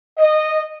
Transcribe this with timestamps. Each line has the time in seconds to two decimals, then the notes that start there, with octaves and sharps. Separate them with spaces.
0.19 D#5